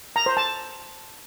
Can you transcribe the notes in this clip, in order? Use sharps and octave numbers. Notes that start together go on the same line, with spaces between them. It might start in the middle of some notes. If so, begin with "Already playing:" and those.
A#5
C5
A5